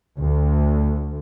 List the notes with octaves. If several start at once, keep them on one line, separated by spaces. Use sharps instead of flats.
D2